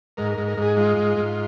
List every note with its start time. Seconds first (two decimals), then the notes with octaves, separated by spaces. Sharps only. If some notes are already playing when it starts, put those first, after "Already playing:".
0.17 G#2 A#4
0.32 A#4
0.37 G#2
0.48 A#4
0.57 G#2 G#4
0.77 G#3 F4
0.97 G#2
1.17 G#2